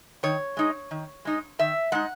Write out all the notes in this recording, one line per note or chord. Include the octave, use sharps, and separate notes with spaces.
D#3 C#5
G#3 D#4
D#3
G#3 D#4
D#3 E5
G#3 D#4 F#5